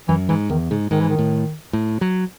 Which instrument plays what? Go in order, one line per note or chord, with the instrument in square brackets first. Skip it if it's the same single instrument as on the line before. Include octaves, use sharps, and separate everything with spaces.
[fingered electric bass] F#2 [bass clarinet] E3
[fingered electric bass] G#2 [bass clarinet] E3
[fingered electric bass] E2 [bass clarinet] D#3
[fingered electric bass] G#2 [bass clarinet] C#3
[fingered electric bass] G#2 [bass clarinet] D#3
[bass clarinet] E3
D#3
[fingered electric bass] A2
A2
F#3